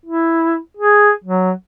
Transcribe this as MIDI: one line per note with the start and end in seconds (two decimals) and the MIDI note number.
0.06 0.58 64
0.77 1.12 68
1.24 1.52 54